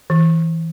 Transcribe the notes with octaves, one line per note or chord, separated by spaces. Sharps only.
E3